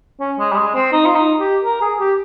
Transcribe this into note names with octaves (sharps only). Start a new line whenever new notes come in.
C#4
G#3
G3
G#3
C4
D#4
F4
D#4
G4
A#4
G#4
G4